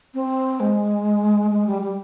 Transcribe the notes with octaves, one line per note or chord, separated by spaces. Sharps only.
C4
G#3
G#3
G3
G3